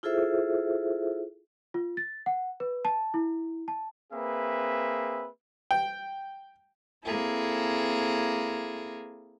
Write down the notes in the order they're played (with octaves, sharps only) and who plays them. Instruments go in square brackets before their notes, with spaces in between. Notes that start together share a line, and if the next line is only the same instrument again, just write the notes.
[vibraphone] E4 F4 G#4 A4 C5 E5
[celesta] F4
A6
F#5
B4
A5
E4
A5
[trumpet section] A#3 C4 G#4 B4 E5
[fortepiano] G5
[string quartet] A#3 C4 E4 G#4 A4